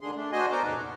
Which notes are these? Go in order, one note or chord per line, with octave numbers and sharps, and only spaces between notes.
D2 D3 D#3 D4 G#4 C6
A3 D4
D4 F#4 C5 D#5 G#5 C6
B3 A4 A#4 C5 A#5 D6
F2 A#2 C#3 D#4 B4
B3